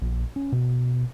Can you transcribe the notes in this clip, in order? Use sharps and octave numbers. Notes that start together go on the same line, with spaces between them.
A#1
C#4
B2